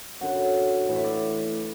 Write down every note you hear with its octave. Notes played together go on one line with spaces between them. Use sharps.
F#2 D3 F#3 F#5
A2 E3
E5
D5